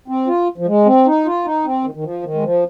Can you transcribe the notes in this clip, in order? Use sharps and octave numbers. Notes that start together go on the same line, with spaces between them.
C4
F4
F3
G#3
C4
D#4
F4
D#4
C4
D#3
D#3
F3
D#3
G#3
F3